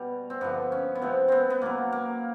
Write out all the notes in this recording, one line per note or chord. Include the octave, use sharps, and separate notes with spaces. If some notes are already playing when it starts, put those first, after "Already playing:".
Already playing: B2 G3
C4
G2 D3 F3 B3
C#4
B3
C3 F3 G#3 C4
B3 C4
B3
B2 F#3 A#3
A#3